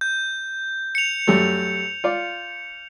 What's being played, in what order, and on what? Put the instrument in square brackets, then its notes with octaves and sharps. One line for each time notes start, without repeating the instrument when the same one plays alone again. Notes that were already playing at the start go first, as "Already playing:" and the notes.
[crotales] G6
C#7 F7
[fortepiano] F#2 G3 A3
F4 D5